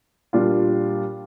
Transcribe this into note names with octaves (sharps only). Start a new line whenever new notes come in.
A#2 G3 D4 F4